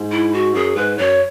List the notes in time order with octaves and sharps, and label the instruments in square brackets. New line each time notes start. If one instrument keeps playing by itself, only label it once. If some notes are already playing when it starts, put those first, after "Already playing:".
Already playing: [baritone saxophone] G#2
[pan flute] E4
F#4
[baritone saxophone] F#2 [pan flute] G#4
[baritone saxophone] G#2 [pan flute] B4
[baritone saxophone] F#2 [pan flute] C#5